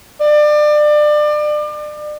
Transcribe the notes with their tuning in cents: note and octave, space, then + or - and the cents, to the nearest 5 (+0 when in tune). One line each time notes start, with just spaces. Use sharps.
D5 +30